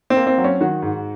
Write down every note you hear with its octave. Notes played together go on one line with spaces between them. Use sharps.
C4
A#3
C4
F#3
C#4
D#3 F#4
G#2